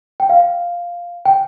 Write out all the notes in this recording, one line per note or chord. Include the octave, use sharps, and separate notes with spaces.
G5
F5
G5